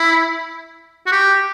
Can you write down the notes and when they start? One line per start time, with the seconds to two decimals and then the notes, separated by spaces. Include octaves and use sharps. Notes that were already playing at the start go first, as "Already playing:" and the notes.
Already playing: E4
1.07 F#4
1.12 G4